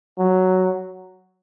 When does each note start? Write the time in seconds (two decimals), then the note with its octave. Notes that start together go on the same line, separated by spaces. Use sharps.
0.18 F#3